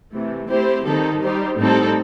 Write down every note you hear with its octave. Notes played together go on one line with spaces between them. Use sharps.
C3 E3 A3
A3 C4 E4 G4 C5
D#3 G3 C4 D#4 A4
G3 D#4 G4 C5
A2 G3 C4 D#4 A4